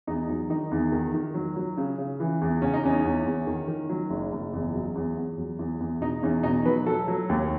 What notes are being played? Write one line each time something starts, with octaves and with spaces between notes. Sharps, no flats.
E2 D#4
F#3
D#3 D#4
E2
D#3
D#3
F#3
F#3
C#3
C#3
E3
E2
C#3 C#4
D#4
E2 C#4
E2
E2
D#3
D#3
F#3
F#1
F#1
E2
F#3
E2
E2
F#3
E2
E2
B2 D#4
E2 C#4
B2 D#4
F#3 B4
F#3 A4
F#3
D#2